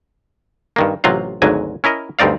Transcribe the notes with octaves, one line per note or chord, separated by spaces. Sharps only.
G2 D#3 A#3
A1 C3 F#3 F4 F5
G#1 D2 G#2 F#3 G#5
C#4 E4 A#4 D#5
D2 G2 C4 D#4 D5 F5